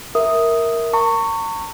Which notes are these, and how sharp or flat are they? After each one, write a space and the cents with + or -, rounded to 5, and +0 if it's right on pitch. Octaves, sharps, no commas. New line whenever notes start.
A#4 +0 E5 -15 D#6 +0
A#5 -45 C#6 +0